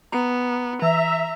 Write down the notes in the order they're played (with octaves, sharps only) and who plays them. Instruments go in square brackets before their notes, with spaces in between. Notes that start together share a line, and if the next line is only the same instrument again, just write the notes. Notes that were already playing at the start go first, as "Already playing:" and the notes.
[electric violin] B3 [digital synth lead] A#5
[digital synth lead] E3 [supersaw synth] E5 [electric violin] A#5